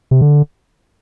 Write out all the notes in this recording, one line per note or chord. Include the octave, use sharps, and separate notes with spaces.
C3
D3